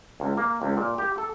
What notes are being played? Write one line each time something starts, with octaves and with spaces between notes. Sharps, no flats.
C#2
A#3
C#2
A#2
G4
A4